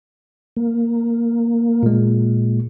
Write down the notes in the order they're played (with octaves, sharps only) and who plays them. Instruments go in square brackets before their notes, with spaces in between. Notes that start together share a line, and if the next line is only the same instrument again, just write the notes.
[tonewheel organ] A#3
[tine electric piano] A#2 G#3